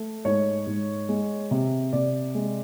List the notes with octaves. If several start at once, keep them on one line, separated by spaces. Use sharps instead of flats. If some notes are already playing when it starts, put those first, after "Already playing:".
Already playing: A3
G#2 C#5
G#2
G#3
C3
C3 D5
G#3